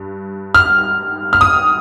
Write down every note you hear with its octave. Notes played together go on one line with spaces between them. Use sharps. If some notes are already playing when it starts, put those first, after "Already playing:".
Already playing: G2
F6
F6
D#6